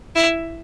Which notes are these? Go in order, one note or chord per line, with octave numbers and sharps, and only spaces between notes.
E4